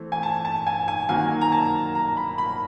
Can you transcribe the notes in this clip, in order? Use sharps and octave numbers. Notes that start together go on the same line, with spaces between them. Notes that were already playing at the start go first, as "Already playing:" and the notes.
Already playing: E3 A3 C4
G#5
A5
A5
G#5
G#5
D#3 F#3 A#3 G#5
A#5
A5
A#5
B5
B5